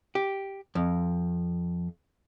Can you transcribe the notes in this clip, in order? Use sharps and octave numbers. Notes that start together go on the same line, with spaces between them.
G4
F2